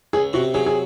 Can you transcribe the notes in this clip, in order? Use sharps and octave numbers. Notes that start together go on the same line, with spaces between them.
C#2 G#4
C3 F#4
F#3 G#4
G#4